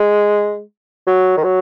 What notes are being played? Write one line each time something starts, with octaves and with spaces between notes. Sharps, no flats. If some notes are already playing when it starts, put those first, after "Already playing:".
Already playing: G#3
F#3
D#3
F#3